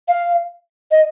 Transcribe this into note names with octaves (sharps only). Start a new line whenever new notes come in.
F5
D#5